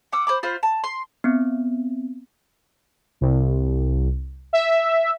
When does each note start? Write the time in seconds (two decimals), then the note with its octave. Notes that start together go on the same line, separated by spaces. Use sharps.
0.13 F#5 D6 E6
0.27 C5 B5 D6
0.43 F4 C5 F5 B5
0.63 A5
0.84 C6
1.24 B3 C4
3.21 C2
4.53 E5